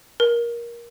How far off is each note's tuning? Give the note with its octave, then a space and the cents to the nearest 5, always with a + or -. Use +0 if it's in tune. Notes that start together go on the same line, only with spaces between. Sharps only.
A#4 +20